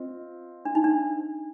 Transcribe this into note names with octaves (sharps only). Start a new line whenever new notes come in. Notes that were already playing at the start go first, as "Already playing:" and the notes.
Already playing: C4 F4 D#5
D4
D#4
D4